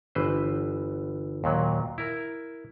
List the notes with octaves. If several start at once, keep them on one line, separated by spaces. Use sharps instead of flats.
G1 E3 B4 C5
D#2 A#2 F#3
E4 A#4